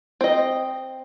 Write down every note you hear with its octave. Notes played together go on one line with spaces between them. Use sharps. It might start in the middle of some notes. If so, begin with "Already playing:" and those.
C4 D#5